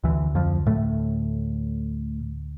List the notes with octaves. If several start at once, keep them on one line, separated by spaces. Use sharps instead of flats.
D2 D3 E3
F2 F3
A2 A3